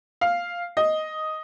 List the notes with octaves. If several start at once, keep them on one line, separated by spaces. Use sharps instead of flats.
F5
D#5